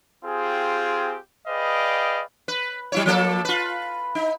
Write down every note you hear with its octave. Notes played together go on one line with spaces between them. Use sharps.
C4 F4 G4 G#4
G#4 B4 D5 D#5 F5 G5
B4
F#3 E4 C#5
F3 A#3 A4
F4 B4
D#4